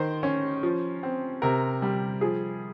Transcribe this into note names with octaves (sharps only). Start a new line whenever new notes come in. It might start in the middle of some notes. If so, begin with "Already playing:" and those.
Already playing: D#3 C5
C#4
F3
C4
C3 A#4
G3
F3 G#4